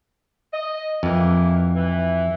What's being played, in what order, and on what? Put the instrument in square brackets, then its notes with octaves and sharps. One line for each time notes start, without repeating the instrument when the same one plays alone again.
[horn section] D#5
[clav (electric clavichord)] F2 [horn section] E3 A#3
[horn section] E3